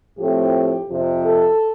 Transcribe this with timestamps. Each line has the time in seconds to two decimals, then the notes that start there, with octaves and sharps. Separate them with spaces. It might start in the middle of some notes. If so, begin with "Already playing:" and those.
0.17 A2 F3 A3 C4 G4
0.89 F2 C3 F3
1.24 A4